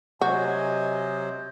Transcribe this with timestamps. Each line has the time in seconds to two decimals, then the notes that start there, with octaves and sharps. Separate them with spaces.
0.21 C3 F#3 F#4 C5 D#5 G#5